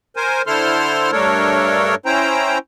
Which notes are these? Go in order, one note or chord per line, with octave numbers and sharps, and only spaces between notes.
A#4 C5 G#5
D3 E4 A4 C5 C6 F6
G2 A3 D4 A4 A#4 C#5
C#4 E4 C5 G5 A#5